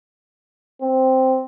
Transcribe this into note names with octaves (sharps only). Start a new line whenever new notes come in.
C4